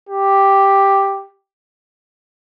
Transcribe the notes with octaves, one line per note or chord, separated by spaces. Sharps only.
G4